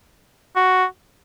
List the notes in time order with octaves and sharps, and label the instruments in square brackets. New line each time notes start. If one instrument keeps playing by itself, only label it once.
[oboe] F#4